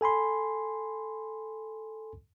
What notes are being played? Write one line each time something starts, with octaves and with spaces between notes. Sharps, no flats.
A4 G#5 B5 C6